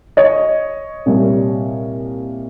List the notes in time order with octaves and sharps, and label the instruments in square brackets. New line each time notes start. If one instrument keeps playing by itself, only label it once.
[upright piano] C#5 D#5
C2 A#2 G3